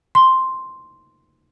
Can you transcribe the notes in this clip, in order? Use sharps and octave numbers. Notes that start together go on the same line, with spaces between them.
C6